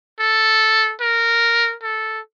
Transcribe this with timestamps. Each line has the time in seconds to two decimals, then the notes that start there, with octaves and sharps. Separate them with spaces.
0.20 A4
1.01 A#4
1.83 A4